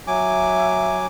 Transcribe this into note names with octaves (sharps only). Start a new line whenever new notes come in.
F#3 E5 G#5 D6